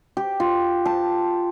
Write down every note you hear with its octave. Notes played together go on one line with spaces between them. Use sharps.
G4
F4
A5